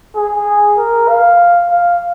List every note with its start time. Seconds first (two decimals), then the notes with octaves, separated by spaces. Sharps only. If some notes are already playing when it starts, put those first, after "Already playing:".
0.16 G#4
0.78 A#4
1.08 F5
1.69 F5